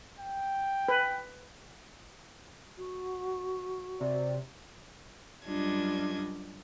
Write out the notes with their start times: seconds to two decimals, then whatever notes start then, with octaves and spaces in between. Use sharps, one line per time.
0.19 G5
0.88 B4
2.77 F#4
4.01 C3 D5
5.46 F#2 G3 D4 F4 D#5 G#6